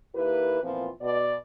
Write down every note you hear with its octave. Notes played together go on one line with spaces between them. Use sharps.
D#2 A#3 E4 G4 B4
A#2 E3 F3 B3 C4 F4
B2 D5